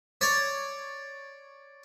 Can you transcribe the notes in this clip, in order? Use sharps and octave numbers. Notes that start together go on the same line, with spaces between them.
C#5 D5